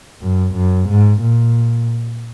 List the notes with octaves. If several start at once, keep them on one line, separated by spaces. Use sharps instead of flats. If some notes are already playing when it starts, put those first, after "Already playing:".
F#2
F#2
G#2
A#2